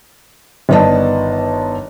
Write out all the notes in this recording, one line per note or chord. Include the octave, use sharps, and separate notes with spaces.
G1 D#3 B3 D5 D#5 A5